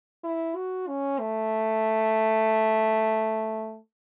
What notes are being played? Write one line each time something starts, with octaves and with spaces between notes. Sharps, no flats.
E4
F#4
C#4
A3